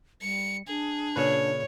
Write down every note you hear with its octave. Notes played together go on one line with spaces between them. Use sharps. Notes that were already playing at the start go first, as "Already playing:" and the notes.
G3 C#7
D4 G#4
A#2 C#3 B4 C#5